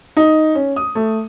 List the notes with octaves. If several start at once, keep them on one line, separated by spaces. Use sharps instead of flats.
D#4
C#4
D#6
A3